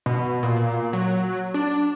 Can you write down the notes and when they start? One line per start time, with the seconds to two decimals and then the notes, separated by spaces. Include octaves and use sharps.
0.06 B2
0.43 A#2
0.93 F#3
1.54 D4